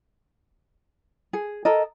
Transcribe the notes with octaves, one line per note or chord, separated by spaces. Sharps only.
G#4
A4 A#4 D#5